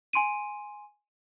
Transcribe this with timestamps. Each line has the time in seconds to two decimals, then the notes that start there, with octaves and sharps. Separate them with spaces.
0.13 G#5 C6 D7 D#7